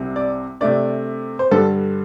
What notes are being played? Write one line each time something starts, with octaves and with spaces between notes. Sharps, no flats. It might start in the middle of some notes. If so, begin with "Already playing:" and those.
Already playing: C2 C3 G3
D5
C3 A3 D4 D5
C5
G2 D3 G3 A4